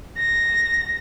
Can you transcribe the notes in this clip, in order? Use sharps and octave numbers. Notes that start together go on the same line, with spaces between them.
A#6